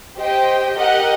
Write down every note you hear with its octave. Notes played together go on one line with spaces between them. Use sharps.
G4 C5 D#5 G5
G4 A#4 D#5 F#5